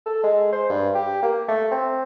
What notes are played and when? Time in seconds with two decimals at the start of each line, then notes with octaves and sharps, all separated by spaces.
0.06 A4
0.23 G#3
0.53 C5
0.69 G2
0.94 G4
1.23 A#3
1.48 A3
1.71 C4